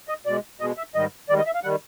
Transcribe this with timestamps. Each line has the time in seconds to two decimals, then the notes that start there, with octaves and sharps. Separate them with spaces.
0.09 D#5
0.26 B2 G#3 D5
0.60 B2 G#3 D#5
0.77 E5
0.95 G#2 D#3 G3 D#5
1.29 G#2 D#3 G3 D5
1.38 D#5
1.46 E5
1.55 F5
1.64 D#3 G3 F#5